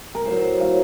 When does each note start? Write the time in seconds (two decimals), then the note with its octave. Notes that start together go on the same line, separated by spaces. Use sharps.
0.15 A#4
0.26 A2 F#3 C5
0.60 A2 F#3 F5